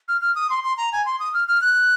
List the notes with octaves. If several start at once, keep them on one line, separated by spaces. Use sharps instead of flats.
F6
F6
D#6
C6
C6
A#5
G#5
C6
D#6
F6
F6
F#6